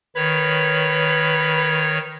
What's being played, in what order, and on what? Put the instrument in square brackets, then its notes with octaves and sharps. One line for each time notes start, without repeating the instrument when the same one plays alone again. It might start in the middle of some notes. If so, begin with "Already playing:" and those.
[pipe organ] D#3 C#5 [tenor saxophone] B4